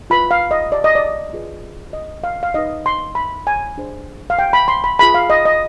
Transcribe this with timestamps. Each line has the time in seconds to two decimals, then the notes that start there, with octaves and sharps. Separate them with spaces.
0.10 F4 B4 B5
0.31 F5
0.51 D#5
0.72 D5
0.84 D#5
0.95 D5
1.33 F4 G#4 B4
1.93 D#5
2.24 F5
2.43 F5
2.54 D#4 B4 D#5
2.86 C6
3.15 B5
3.47 G#5
3.77 D4 G#4 C5
4.30 F5
4.39 G5
4.53 B5
4.68 C6
4.84 B5
4.99 F4 G#4 B4 B5
5.14 F5
5.30 D#5
5.45 D#5